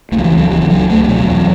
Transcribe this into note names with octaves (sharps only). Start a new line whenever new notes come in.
C#2 A3
F#3
E3
C#2
F#3
C#2 E3
E3
C#2 F#3
C#2 A3
A3
B2 F#3
E2